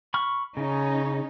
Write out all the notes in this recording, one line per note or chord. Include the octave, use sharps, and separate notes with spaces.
B5 C#6 F6
C#3 C#4 D#4